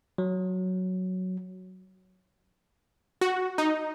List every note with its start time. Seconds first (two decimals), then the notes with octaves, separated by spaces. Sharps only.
0.18 F#3
3.21 F#4
3.58 D#4